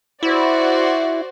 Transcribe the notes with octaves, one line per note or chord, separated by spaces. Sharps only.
E4 F#4 C5 D5